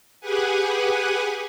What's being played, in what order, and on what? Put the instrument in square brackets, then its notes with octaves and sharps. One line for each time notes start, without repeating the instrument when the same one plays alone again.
[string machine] G4 G#4 B4 F#5 G#5